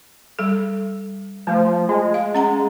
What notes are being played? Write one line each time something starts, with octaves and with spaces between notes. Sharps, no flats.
G3 A4
F3 A3
G#3
F5
C#4 F#5 A#5